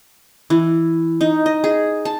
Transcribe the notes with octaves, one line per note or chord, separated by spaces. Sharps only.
E3
D#4
D#5
G#4
A5